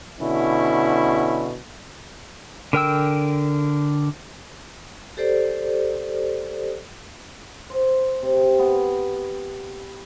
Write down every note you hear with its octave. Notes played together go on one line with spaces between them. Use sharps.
B2 D3 C#4 E4
D3 A#4 G5 E6
G4 A4 C5 D5
C5
C3
B3